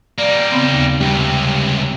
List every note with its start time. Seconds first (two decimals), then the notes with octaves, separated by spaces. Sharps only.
0.18 G3 A#3 D5
0.52 C#3 B3 C4
0.73 D#2
1.01 C#2 C3 G3 C#4